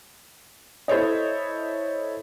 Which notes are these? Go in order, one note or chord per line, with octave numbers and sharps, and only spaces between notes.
E4 A4 C5 C#5 D#5